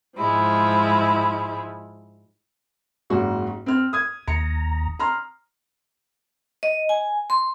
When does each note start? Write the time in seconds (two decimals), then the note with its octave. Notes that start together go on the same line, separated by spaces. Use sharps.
0.17 G#2 F3 G#3 E4
3.10 F#1 G#2 F#4
3.66 C4 F6
3.93 D#6 G#6
4.28 D#2 A#5 C#7
4.99 A#5 C6 F6
6.63 D#5
6.89 G#5
7.30 C6